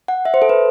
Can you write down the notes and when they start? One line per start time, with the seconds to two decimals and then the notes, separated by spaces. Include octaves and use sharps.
0.08 F#5
0.25 E5
0.34 C5
0.42 A4
0.49 B4